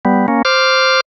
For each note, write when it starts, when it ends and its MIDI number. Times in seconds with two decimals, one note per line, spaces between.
0.05 0.27 55
0.05 0.27 59
0.28 0.42 58
0.28 0.42 61
0.45 1.00 72
0.45 1.00 86
0.45 1.00 89